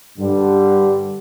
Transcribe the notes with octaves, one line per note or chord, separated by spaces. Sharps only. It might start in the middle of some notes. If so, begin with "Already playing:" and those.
G2 D3 G3